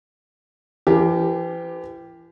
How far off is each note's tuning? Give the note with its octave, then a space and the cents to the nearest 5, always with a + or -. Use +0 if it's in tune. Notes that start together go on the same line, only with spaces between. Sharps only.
E3 +40 G4 +0 A#4 +0